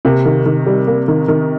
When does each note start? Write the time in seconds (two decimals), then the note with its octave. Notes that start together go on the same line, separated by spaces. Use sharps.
0.05 C3 A#3
0.25 D#3
0.46 D#3
0.67 G3
0.87 A#3
1.08 D#3
1.28 D#3